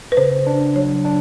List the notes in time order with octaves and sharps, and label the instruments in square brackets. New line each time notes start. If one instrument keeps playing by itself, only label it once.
[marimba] B4
[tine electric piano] C#3 [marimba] C5
[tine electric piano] D4
[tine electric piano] F#3 [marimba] C#5
[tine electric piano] D4